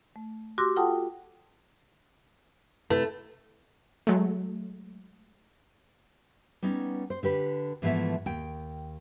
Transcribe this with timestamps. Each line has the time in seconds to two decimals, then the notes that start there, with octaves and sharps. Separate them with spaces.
0.16 A3
0.58 F#4 G4 C6 D6 E6 A#6
0.76 F4 A4 F#5 G5 A5 D#6
2.90 C3 A3 E4 B4
4.07 F#3 G#3 A3
6.62 G3 B3 C#4 D#4
7.10 C5
7.23 D3 G4 B4
7.82 G#2 E3 F3 A3 B3 E5
8.26 D#2 G5